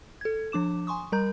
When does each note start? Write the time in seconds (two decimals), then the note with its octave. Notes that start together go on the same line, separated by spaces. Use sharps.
0.21 A4 G#6
0.52 F3 D4 D6 E7
0.87 G#5 C6 C#6 D#6
1.12 G3 A#4 A#5 G6